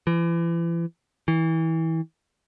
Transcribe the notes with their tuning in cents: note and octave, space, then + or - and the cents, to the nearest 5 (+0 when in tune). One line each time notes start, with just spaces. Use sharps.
E3 +35
E3 -25